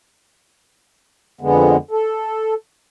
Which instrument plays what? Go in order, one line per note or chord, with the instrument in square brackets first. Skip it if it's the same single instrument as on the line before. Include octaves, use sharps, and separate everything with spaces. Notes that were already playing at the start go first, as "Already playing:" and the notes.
[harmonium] F2 D3 G#3 B3
A4